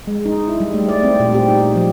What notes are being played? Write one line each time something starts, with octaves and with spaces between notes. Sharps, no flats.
G#3
D#4
E4
G3
A3
D5
C4
A#2
G4
D#4
F3